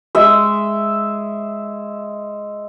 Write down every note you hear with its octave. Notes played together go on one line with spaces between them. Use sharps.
G#3 E5